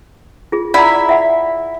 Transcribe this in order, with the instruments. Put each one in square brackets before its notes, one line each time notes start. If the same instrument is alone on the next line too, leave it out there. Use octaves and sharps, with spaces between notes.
[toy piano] F4 G#4
[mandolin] E4 [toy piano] D5 F#5 A#5
[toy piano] E5 F#5 B5